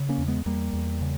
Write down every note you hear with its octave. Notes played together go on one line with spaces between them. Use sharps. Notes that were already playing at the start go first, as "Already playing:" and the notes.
Already playing: C#3
A#3 C#4
E2
G#3 B3
E2 G3 A#3
E2
C#3